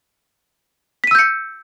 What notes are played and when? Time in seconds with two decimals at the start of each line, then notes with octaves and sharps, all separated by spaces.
1.04 B6
1.07 D#7
1.11 E6
1.15 G6
1.19 C#7